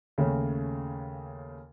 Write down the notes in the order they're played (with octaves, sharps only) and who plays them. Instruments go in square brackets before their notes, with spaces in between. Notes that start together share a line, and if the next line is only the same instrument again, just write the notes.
[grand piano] D#2 C#3 A3 C#4